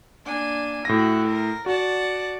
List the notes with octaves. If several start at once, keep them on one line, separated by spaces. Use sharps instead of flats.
A#3 D4 G#5
A2 E4 F#4 A#6
A#4
F#4 D5 F#5 A5